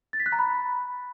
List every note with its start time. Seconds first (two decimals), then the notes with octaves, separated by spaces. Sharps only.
0.13 A6
0.20 B6
0.26 F#6
0.32 A#5
0.39 B5